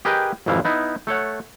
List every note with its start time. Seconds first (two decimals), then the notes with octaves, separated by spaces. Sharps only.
0.05 G4 G#4 A#4 B4 D#5 G5
0.46 G#1 F2 C3 E3 E4 F5
0.65 B3 D#4 E4
1.07 A3 A4 C#5 F#5